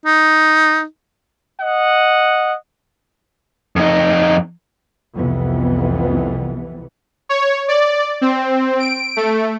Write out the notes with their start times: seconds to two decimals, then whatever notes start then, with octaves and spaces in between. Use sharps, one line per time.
0.06 D#4
1.61 D#5 F#5
3.76 F2 D#4
5.15 C2 F2 C3 E3 B3
7.29 C#5
7.68 D5
8.21 C4
8.80 D7
9.17 A3